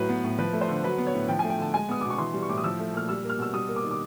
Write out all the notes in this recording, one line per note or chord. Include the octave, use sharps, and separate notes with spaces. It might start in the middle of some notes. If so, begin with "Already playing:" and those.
Already playing: A2 F#3 B4
B3
A2
F3 B4
A3
C5
D3
F#3 B4
B3
C#5
A2
F3 G5
A3 G#5
G5
D3 A5
G#3 G#5
B3 D#6
B2 D6
C#6
E3 C6
G3
C#6
A2 D6
D#6
F3 E6
A3
A#2 F6
G3 E6
A#3
F6
B2 E6
G3 D#6
A#3
D6
D#3
D6